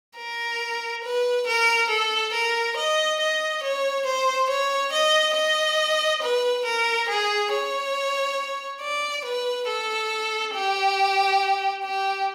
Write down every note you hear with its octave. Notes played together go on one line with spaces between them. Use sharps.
A#4
B4
A#4
A4
A#4
D#5
D#5
C#5
C5
C#5
D#5
D#5
B4
A#4
G#4
C#5
D5
B4
A4
G4
G4